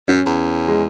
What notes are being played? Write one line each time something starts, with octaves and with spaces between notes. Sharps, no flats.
F#2 C#4
E2
G#3